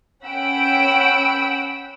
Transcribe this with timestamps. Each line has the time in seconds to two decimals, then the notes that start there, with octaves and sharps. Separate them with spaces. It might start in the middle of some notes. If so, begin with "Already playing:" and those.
0.24 C#4 F#5 G5 B5 E6 D7